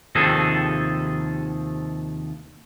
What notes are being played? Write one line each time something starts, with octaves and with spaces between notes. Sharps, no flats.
D#2 C3 D#3 F3 G#4 A4